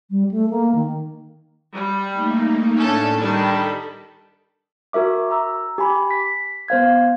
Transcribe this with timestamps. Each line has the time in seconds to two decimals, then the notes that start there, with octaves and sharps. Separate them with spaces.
0.10 G3
0.31 A3
0.50 A#3
0.75 D#3
1.73 G3
2.12 A3 A#3 D#4
2.77 A2 A3 C#4 D4 A4
3.19 D#3 G3 D4 A4 B5
4.93 F#4 A#4 E5 D6
5.31 A#5 E6
5.78 G4 G#5 B5
6.11 B6
6.68 B3 C5 F5 G#6